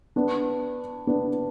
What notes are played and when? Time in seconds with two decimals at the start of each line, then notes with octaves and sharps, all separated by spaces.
0.16 B3 D4
1.07 B3 D4